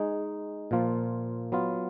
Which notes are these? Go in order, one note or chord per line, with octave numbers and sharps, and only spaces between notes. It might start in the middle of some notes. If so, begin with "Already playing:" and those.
Already playing: G#3 D#4 G#4
A#2 F3 A#3 F4
F#3 B3 F4